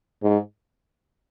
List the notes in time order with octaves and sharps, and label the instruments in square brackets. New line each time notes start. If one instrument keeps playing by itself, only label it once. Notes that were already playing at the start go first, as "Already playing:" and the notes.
[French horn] G#2